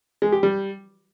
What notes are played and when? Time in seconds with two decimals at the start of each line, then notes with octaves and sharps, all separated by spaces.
0.22 G#3
0.32 G4
0.43 G3